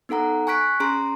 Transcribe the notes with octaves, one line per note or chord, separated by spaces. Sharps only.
B3 D#4 A4 F#5 A#5
G#5 C#6 F#6 B6 D7
C#4 G#4 A#5 C6 D7